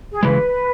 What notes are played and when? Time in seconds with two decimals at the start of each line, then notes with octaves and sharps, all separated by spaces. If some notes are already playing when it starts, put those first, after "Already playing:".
0.12 G#4
0.23 C#3 E3 G#3 B4